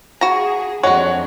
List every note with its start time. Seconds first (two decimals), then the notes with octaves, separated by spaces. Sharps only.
0.21 F#4 G#4 A#5
0.83 F2 G#3 D4 F#4 C#5 F#5